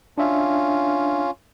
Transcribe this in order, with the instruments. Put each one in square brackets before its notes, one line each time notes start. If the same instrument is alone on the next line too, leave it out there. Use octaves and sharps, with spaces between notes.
[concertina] C#4 F4 [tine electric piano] D4 E5